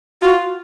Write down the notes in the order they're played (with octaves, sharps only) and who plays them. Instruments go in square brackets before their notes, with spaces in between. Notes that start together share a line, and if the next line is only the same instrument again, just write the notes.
[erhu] F4 [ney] F#4